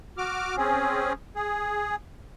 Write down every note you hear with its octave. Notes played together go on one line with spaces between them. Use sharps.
F#4 D6 F6
C4 C#4 G#4
G#4